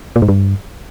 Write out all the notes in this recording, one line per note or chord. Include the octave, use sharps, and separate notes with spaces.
A#2
G#2
G2